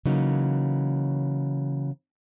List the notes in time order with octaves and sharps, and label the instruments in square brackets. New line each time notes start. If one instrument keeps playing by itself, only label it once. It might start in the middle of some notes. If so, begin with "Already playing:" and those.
[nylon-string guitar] C#3 E3 F#3 A#3 D#4